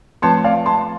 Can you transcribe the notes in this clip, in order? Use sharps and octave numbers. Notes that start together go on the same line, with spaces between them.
F3 A3 C4 F4 B4 A5 C6
D5 F5
A5 C6